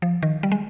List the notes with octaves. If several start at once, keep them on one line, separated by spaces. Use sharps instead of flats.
F3
D#3
G3
G#3